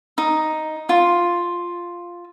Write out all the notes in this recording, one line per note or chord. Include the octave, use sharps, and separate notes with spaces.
D#4
F4